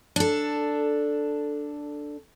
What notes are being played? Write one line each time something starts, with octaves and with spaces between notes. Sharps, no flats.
D4 A4